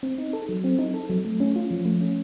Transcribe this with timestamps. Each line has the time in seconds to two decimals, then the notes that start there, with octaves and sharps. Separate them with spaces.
0.03 C4
0.18 D#4
0.33 A4
0.49 F#3
0.64 C4
0.79 D#4
0.94 A4
1.10 F#3
1.25 A3
1.40 C#4
1.56 F4
1.71 F3
1.85 A3
2.01 C#4